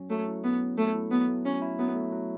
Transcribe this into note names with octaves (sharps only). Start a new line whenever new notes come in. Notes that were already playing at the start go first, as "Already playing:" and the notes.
Already playing: F#3 C#4
F#3 A3
E4
F#3 B3
C#4
F#3 A3
E4
F#3 B3
A3
F#3 C#4
E4
F#3 B3
A3
F#3